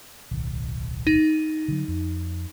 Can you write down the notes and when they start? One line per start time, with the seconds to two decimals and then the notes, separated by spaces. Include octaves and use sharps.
0.31 D1 B1 D#3
1.07 D#4
1.68 D3 D#3 F#3
1.88 F2